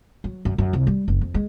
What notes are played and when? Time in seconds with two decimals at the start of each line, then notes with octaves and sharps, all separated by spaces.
0.24 F#3
0.45 F#2
0.58 F#2
0.73 C2
0.87 G3
1.08 F#1
1.21 F2
1.34 G#3